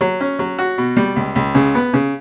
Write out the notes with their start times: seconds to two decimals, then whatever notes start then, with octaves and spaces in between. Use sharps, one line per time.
0.01 F#3
0.20 C#4
0.39 F#3
0.58 F#4
0.78 B2
0.97 G3
1.16 C#2
1.36 C#2
1.55 C#3
1.75 B3
1.93 C#3